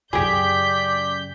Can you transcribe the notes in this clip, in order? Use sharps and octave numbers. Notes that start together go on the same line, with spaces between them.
F#2 C#3 G4 G#4 D5 G6 B6